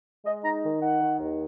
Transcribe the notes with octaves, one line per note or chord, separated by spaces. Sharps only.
G#3 D#5
D#4 A#5
D#3
D#4 F#5
D#3
D#2